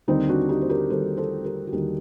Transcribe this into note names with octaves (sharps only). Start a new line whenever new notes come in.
D#2 D3 G3 C4 D#4
D4 F#4
D#4 G4
C5
G4 A#4
D#2 D3 G3 A4 C5
A4 C5
G4 A#4
F#4
D#2 D3 G3 D#4 G4